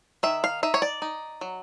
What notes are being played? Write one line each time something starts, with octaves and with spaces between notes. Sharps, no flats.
D#3 E5
F5
D#4 E5
C#5
D5
D#4
F#3